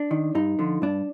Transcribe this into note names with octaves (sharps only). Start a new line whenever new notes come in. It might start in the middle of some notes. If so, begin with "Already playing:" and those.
Already playing: D4
D#3
G2 D#4
D3 F3
G2 D4